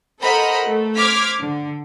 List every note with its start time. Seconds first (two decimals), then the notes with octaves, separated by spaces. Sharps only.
0.21 A4 A#4 C5 D#5 F#5 B5
0.64 A3
0.96 C5 D6 F6 G#6 B6
1.40 D3